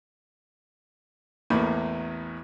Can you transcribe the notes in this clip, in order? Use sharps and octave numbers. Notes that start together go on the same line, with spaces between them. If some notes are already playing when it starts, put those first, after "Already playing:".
A1 E2 A2 A#3 B5